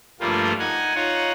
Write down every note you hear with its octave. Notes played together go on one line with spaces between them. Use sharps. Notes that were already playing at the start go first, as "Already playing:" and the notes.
G2 F3 G3 A3 A#3 F4
D#4 F#5 G#5
D#4 F4 C#5 F#5